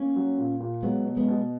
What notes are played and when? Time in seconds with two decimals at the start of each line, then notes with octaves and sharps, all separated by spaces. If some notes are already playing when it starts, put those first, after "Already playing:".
Already playing: A#3 C#4
0.16 F#3
0.38 A#2
0.60 A#2
0.83 F#3 G#3 B3
1.05 B2
1.17 G#3 B3
1.29 B2